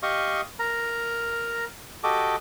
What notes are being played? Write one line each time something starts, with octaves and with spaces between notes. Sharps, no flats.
G4 D#5 F5 C#6 D#6
A#4 A#5
F#4 G4 A4 D#5 D6